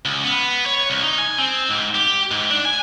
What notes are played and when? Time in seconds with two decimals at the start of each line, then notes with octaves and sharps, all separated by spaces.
0.05 C#2
0.24 B3
0.66 C#5
0.90 C2
1.03 D#4
1.18 G#5
1.38 C4
1.69 G#2
1.95 G4
2.31 G#2
2.50 D4
2.65 G#5